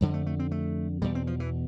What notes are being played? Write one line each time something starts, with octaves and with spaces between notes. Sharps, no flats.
F2 D3 G3
A3
A3
C4
A3
E2 B2 G3
C4
F3
E3